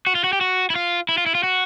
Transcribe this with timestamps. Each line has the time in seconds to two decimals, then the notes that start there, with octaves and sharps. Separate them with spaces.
0.07 F#4
0.15 F4
0.24 F#4
0.33 G4
0.41 F#4
0.70 E4
0.75 F4
1.09 E4
1.18 F4
1.26 E4
1.35 F4
1.43 F#4